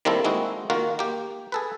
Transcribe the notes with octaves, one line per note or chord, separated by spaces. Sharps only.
D#3 G3 A#3 C4 E4 A4
G#3 A#3 C4 D#4 E4 F#4
D#3 A#3 F4 F#4
A#3 G4
G#4 A4 B4